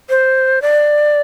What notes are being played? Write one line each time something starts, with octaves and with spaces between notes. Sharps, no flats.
C5
D5